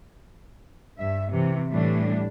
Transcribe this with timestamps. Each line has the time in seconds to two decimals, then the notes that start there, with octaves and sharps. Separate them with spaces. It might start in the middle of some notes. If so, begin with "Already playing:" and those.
0.98 G2 E5
1.31 C3 E3
1.69 A2 E3 G3 A3 D4